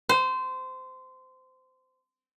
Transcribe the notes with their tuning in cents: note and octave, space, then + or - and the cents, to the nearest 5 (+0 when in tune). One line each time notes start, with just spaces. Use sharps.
C5 -20